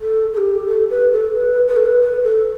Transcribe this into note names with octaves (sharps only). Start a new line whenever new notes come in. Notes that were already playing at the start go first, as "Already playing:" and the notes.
A4
A4
G4
A4
B4
A4
B4
B4
A4
B4
B4
A4